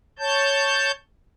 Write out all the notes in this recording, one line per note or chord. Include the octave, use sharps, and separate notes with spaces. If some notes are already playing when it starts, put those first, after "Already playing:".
C#5 A5 G6